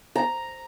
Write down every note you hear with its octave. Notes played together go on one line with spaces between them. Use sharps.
A#5